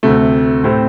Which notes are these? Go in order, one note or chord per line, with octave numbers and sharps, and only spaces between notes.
D2 C3 A3
A2 A3 C4 G4